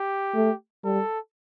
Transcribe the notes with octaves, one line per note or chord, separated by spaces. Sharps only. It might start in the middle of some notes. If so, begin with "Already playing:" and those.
Already playing: G4
A3
G3 A4